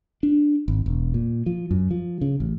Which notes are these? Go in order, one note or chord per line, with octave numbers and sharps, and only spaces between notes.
D4
G#1
E1
A#2
F3
F#2
F3
C#3
A1